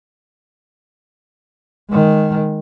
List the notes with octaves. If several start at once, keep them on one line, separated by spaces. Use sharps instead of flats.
D#3 G#3